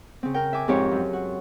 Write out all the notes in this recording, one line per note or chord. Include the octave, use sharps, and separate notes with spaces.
C#3 C4
A#4 G5
E5 G#5 D6
F2 G#2 C4 G4 C5 C#5
F#2
F#4